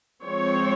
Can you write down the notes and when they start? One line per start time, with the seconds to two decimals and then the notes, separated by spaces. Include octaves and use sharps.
0.23 F3 G#3 C4 C#5